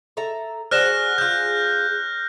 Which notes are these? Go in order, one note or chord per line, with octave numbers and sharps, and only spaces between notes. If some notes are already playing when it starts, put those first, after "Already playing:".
A4 E5 A#5
F#4 G#4 C5 D5 F6 F#6 A#6 E7
F4 G#4 F6 G6